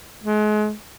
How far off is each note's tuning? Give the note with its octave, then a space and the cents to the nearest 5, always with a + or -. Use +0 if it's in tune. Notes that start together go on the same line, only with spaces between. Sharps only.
G#3 +35